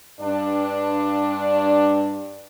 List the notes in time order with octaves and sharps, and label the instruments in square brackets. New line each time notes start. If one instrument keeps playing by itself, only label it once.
[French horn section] G2 D4